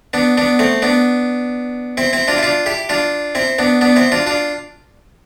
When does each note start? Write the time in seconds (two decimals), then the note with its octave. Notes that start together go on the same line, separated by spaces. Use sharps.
0.13 B3 D4
0.38 B3 D4
0.59 A3 C4
0.82 B3 D4
1.97 C4 E4
2.13 C4 E4
2.28 D4 F4
2.38 E4
2.43 D4 F4
2.66 E4 G4
2.89 D4 F4
3.35 C4 E4
3.58 B3 D4
3.81 B3 D4
3.96 C4 E4
4.12 D4 F4
4.26 D4 F4